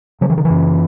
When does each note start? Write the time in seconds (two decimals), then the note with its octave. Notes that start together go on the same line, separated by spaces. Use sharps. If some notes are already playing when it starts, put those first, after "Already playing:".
0.21 C#3 F#3
0.30 E3
0.38 D#3
0.45 E3
0.50 F#2